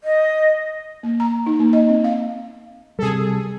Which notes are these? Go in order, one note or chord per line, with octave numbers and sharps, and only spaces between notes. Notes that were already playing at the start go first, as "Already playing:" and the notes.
D#5
A#3
A#5
D#4
A#3
D#5
C4
F5
C3 G3 G#4 A4